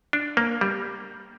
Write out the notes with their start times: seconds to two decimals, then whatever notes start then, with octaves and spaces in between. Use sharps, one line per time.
0.13 D4
0.37 A#3
0.61 G3